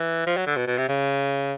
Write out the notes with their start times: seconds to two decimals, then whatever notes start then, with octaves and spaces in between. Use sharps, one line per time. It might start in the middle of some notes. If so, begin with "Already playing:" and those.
Already playing: E3
0.26 F3
0.37 F#3
0.46 D3
0.57 B2
0.67 B2
0.78 C3
0.89 C#3